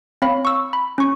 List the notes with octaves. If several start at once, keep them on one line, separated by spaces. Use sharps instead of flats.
C4 C#5 F5 B5
C#6 E6
B5
C#4 C#6